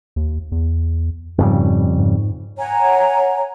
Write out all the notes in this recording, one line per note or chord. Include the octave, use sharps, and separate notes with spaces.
D#2
E2
F2 G#2 C#3 G3
G#2
C#5 F#5 G#5 A#5